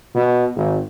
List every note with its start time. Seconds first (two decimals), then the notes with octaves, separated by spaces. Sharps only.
0.15 B2
0.55 G#1